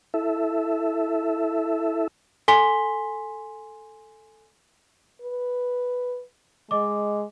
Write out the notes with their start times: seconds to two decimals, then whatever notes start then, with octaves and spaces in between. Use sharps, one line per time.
0.14 E4 A4 E5
2.48 A4 G#5 C6 B6 G7
5.21 B4
6.71 G#3 D#5 D6